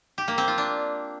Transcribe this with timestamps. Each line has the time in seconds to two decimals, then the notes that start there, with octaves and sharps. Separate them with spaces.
0.18 G4
0.28 A#3
0.38 C4
0.48 F4
0.58 D4